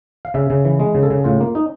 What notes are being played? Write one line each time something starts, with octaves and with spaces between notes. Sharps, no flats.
F5
C#3 E5
C#3
E3
G#3
C#3
A4
C#3
A2 F4
A#3
D#4